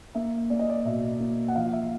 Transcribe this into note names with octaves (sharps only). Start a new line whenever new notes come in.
A#3 E5
A#3 D5
D#5
D5
B2 E5
A#3
F#5
F3 F5
E5